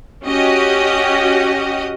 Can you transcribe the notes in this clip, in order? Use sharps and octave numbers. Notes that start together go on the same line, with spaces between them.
C#4 F#4 G4 D#5